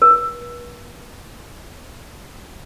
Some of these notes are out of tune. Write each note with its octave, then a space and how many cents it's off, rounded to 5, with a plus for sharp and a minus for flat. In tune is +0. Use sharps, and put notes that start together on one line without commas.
B4 -40